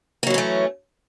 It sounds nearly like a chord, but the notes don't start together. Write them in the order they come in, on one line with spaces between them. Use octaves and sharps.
A#3 F#3 E3 C#4 A3